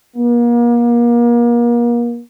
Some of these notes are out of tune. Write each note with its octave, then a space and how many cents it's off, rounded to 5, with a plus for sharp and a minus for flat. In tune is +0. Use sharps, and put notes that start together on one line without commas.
A#3 +35